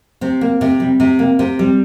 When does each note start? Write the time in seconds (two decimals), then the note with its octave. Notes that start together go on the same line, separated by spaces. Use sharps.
0.21 C3 C4
0.41 A#3
0.61 C3
0.80 G3
1.00 C3
1.19 A#3
1.39 C3
1.59 G3